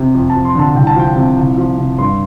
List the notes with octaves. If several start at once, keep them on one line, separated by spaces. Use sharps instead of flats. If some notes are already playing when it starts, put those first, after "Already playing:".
Already playing: C3
F2
A5
F3
C6
D3 A5
C2 G5
A5
F3 G5
C3
C2
F3
C3
G2 C6